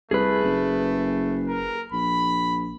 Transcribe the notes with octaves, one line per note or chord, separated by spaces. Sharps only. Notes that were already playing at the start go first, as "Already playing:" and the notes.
C2 A3 G#4 B4
F#1
A#4
A#1 B5